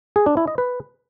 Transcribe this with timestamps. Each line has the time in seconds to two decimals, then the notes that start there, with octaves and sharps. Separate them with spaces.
0.16 G#4
0.26 D4
0.37 E4
0.48 D#5
0.58 B4